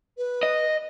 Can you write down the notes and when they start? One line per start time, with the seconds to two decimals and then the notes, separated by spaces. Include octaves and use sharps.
0.17 B4
0.43 D#5